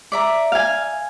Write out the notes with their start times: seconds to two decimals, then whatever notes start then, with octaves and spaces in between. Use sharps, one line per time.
0.12 D5 E5 A#5
0.52 F5 G#5